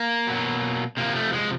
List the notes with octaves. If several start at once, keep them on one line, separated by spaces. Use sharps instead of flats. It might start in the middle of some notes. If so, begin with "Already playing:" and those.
Already playing: A#3
B2 F#3
C3 F3 A#3
A3
G#3